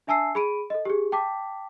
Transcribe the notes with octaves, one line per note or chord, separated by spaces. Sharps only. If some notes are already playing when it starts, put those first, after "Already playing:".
D4 E5 G#5 A5 E6 C7
G#4 B5 D7 D#7
A4 D#5
G4 G#4
G5 A5 D6 B6